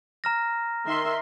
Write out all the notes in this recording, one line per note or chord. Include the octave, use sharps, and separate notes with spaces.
A#5 F6 A#6
D#3 E5 C6